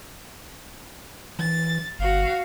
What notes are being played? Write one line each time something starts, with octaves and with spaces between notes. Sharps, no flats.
E3 A6
G1 F#4 F5